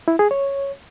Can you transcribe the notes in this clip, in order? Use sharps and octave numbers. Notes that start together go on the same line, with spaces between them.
E4
G#4
C#5